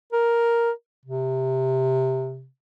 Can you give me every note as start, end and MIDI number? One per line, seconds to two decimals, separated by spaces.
0.13 0.71 70
1.05 2.48 48